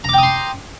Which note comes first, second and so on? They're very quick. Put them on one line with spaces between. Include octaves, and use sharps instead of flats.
A#5 D6 G5 D#6 C6